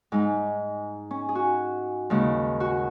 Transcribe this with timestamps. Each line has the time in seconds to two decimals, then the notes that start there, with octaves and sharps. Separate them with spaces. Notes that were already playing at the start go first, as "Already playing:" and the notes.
0.12 G#2 G#3 D#4
1.11 C#4
1.29 G#4
1.35 F#4
2.10 D#2 C#3 G#3
2.60 F#4